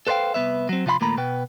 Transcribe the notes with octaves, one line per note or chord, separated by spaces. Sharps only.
A4 B4 C5 D5 F5 G5
C2 G#2 B3 B4 E5
F#3 C4
C3 F3 F4 F5 B5 C6
D#2 A#2 A3 A#3 A#5 B5
B2 B3 B4 G5